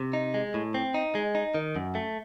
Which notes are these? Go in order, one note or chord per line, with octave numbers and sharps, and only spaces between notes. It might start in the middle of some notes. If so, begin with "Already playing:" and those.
Already playing: C3
D#4
G#3
A2
C4
D#4
G#3
D#4
D#3
F#2
A3